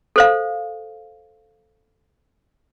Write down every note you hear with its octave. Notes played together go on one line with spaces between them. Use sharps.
A4 C5 F5